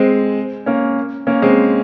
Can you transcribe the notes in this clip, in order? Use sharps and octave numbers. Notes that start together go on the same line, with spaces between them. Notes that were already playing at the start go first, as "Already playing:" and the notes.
Already playing: G#3 C4
A#3 C#4
A#3 C#4
G#3 C4